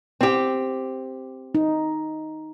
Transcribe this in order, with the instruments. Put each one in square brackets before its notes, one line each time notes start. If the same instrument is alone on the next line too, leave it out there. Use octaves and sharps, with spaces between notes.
[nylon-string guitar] C4 G4
[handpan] D#4